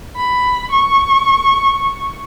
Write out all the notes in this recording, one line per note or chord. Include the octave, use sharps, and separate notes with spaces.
B5
C#6